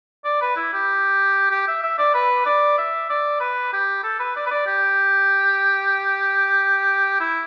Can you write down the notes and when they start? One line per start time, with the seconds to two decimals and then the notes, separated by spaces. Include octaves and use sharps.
0.25 D5
0.41 B4
0.56 E4
0.73 G4
1.51 G4
1.68 E5
1.83 E5
1.98 D5
2.14 B4
2.46 D5
2.78 E5
3.10 D5
3.40 B4
3.73 G4
4.04 A4
4.19 B4
4.36 D5
4.46 B4
4.51 D5
4.67 G4
7.20 E4